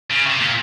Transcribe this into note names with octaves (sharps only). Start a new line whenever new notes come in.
C#3
C3
A#2